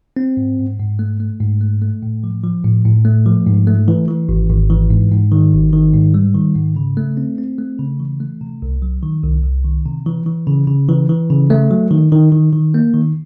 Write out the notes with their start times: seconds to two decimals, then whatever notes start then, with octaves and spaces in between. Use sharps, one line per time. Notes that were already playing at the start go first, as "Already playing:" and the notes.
0.17 C4
0.37 G#2
0.59 G#2
0.79 G#2
0.99 A3
1.20 A3
1.40 G#2
1.61 A3
1.82 A3
2.03 A2
2.24 F3
2.44 F3
2.64 A2
2.85 A2
3.05 A3
3.26 F3
3.47 G#2
3.67 A3
3.88 E3
4.08 E3
4.29 G#1
4.50 G#1
4.70 E3
4.90 G#2
5.12 G#2
5.32 D#3
5.53 G#1
5.73 D#3
5.93 G#2
6.14 G3
6.35 D#3
6.56 G#2
6.76 C#3
6.97 A3
7.17 C4
7.38 C4
7.58 A3
7.79 C#3
8.00 E3
8.20 A3
8.41 C3
8.62 C2
8.82 F#3
9.03 D#3
9.24 C2
9.44 C2
9.65 D#3
9.86 C3
10.06 E3
10.26 E3
10.47 C#3
10.68 C#3
10.89 E3
11.09 E3
11.30 C#3
11.50 A3
11.71 F#3
11.91 D#3
12.12 D#3
12.32 D#3
12.53 D#3
12.74 A#3
12.94 D#3